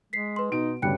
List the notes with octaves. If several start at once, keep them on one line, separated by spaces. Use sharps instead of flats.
G#3 B6 C7
B4 C6
B2 D#4 D7
D2 G2 C#3 G3 G5 F#6 C#7